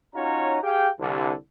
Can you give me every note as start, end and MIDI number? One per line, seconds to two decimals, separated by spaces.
0.15 0.59 61
0.15 0.59 63
0.15 0.59 65
0.15 0.59 66
0.15 0.59 73
0.15 0.59 82
0.63 0.90 67
0.63 0.90 68
0.63 0.90 77
0.63 0.90 79
1.00 1.33 36
1.00 1.33 50